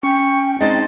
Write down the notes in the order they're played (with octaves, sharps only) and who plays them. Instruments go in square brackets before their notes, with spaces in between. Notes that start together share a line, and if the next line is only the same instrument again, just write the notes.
[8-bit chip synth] C#4 [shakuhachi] G5 [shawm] C#6
[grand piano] G#3 C4 A6 [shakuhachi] D#4 [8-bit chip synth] D#5 [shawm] A5